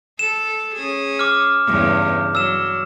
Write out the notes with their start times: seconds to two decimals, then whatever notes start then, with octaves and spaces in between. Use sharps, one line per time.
0.19 A4 E7
0.75 C#4 G#4
1.19 D6 F6
1.66 E2 G2 C#3
2.35 F#3 E6 E7